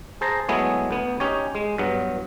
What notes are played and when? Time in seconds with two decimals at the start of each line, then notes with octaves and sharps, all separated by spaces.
0.21 G#4 C5 A5 A#5
0.49 F#3 G#3 A3 B3 E4 G#4
0.91 D2 B3
1.20 C#4 D#4 G4 C#5
1.55 G#3
1.78 G2 F#3 B3